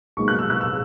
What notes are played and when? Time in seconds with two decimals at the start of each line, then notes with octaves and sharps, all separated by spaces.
0.17 B1 A#2 G#3 C#6
0.28 F#6
0.39 E6
0.50 F#6
0.61 E6